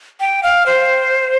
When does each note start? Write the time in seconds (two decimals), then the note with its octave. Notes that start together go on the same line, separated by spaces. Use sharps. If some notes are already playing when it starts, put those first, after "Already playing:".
0.20 G5
0.43 F5
0.66 C5